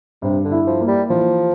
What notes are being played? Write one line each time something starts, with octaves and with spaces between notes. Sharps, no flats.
G2 C3
D3
E4
F3
A#3
G3
E3 F3